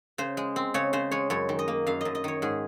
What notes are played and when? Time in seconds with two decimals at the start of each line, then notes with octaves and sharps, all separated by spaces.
0.18 C#3 C5
0.37 G#3
0.56 C4
0.74 C#3 C#5
0.93 C#3 C5
1.11 G#3 C#5
1.30 F#2 C#5
1.49 D#3
1.59 D#5
1.68 A#3
1.86 F#2 F5
2.01 F#2 D#5
2.15 D#5
2.24 D#3 C#5
2.42 G#2 G#4